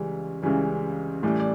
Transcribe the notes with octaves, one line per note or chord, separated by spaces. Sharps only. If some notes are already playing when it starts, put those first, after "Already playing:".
Already playing: C#2 C#3 E3 G3
C#2 C#3 E3 G3
A2 E3 G3 D5
D5